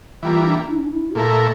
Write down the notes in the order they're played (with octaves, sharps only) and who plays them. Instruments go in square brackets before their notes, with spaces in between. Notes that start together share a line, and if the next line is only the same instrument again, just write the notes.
[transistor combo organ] E3 G3 A#3 [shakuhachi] F4
[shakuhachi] E4
D4
E4
C#4
D4
E4
[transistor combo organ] A#2 A3 E4 A#4 [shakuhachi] A4